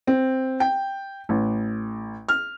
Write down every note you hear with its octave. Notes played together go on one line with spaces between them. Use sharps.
C4
G5
A1
F6